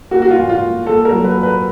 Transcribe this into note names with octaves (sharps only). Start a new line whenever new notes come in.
A#3 F#4
F#4
F4
A#2
F4
A#2
A#3 A4
A#4
F#3
B4
A#2
B4